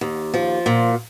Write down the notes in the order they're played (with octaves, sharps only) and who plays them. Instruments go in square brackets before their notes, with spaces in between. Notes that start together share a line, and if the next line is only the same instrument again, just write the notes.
[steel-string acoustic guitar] D#2
F3
A#2